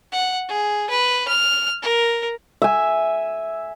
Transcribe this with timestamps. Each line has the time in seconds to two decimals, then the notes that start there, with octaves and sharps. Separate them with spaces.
0.12 F#5
0.49 G#4
0.90 B4
1.28 F6
1.83 A#4
2.62 E5 G#5